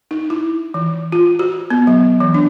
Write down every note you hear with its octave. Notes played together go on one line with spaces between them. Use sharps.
D#4
E4
E3
F4
F#4
B3
F#3
E3
D4